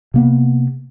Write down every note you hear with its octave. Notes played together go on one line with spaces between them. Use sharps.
C3 A#3 B3